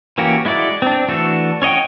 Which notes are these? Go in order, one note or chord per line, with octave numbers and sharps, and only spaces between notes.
E3 A#3 C#4 F#4 G4
G#3 E4 F#4 D5
C4 D4
E3 A3 D4 F#4 A4
C#4 C#5 D#5 F#5 G5